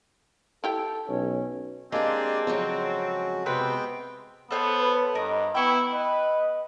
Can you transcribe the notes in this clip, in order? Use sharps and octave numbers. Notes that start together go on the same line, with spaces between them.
E4 G4 A4 G5
B1 C#4
G#3 A#3 C4 D4 G4 D5 G#5
F2 C#3 F#3 F#4
C3 G#3 B3 C4 B4 G5
B3 A4 C5 C#5
B4
G2 A#4 D#5
B3 E4 G5 C#6
B4 D#5